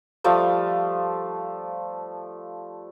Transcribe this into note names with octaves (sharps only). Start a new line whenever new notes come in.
F3 G3 A3 F5